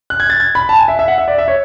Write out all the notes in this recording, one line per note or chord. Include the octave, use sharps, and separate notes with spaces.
F#6
G#6
A6
G#6
B5
A5
G#5
E5
E5
F#5
E5
D5
E5
C#5